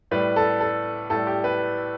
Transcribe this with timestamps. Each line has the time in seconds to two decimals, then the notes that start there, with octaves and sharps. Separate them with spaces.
0.11 A2 G3 B4
0.36 A4
0.61 A4
1.10 A2 G3 A4
1.27 G4
1.44 B4